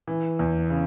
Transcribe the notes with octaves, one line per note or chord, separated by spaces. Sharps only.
E3
E2
C#3